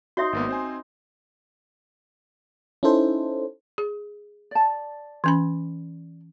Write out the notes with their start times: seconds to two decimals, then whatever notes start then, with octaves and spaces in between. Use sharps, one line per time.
0.17 D#4 F#4 C#5 E5 C6
0.33 G#1 A#3 B3
0.49 C4 C5 G#5
2.83 C#4 D#4 E4 A4 C5
3.78 G#4
4.51 D5 A5
5.24 E3 C#4 B5